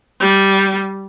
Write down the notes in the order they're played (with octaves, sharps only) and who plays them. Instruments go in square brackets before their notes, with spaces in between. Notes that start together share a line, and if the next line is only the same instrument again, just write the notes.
[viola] G3